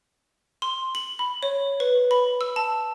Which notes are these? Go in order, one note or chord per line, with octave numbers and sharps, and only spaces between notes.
C6
F#7
B5
C#5
B4
B5
E6
A5